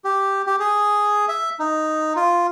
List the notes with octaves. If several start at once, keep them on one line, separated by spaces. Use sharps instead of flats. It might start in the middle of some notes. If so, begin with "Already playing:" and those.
G4
G4
G#4
E5
D#4
F4